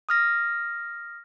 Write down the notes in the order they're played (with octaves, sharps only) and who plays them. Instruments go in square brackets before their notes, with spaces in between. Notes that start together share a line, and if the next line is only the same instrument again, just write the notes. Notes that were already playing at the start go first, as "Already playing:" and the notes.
[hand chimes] D#6 F6 A#6